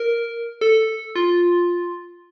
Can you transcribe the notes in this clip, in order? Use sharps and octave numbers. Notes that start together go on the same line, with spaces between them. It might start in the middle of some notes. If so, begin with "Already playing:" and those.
Already playing: A#4
A4
F4